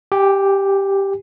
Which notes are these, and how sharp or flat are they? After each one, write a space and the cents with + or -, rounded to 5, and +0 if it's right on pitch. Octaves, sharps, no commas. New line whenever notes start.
G4 +0 G#5 -35